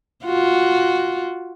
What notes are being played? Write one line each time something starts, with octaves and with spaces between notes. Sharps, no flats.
F4 F#4